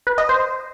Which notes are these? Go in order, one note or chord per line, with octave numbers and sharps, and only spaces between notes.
B4
D#5
C5